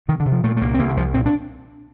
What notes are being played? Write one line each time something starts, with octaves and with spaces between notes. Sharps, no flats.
C3 D#3
D3
C3
F3
A#2 A3
A3
C2 A#3
C4
C2 A#3
D3
C2 F3
A#2 C4
D4